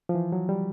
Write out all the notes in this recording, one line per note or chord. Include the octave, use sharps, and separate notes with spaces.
F3
E3
F#3
G3